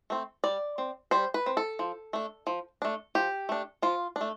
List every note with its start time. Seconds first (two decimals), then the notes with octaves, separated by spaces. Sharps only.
0.10 A3 C4
0.44 G3 D5
0.78 C4
1.11 G3 C5
1.34 B4
1.46 C4
1.57 A4
1.79 F3
2.13 A3 D4
2.47 F3
2.82 A3 D4
3.15 F3 G4
3.49 A3 D4
3.82 F3 F4
4.16 D4
4.21 A3